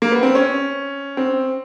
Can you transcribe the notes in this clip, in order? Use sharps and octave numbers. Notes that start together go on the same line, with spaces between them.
A#3
B3
C4
C#4
C4